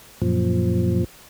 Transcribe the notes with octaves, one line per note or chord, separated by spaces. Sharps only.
F#2 A#2 F3